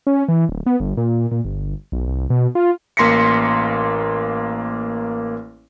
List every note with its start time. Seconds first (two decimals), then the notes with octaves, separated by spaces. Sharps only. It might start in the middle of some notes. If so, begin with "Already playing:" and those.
0.07 C#4
0.28 E3
0.49 D1
0.66 B3
0.80 G1
0.97 A#2
1.31 A#2
1.45 G1
1.92 B1
2.07 C2
2.30 B2
2.55 F4
2.97 A1 A#3 C6 A#6 B6 C#7